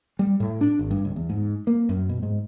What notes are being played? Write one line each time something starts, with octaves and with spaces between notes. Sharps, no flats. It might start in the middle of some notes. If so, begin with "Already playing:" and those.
G3
A2
D4
G#1
G2
C#2
E2
G#2
A#3
F#2
B2
G#2